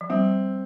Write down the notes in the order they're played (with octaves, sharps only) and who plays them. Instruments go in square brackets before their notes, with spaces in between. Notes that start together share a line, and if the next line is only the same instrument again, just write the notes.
[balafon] F3
[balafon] G3 [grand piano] C4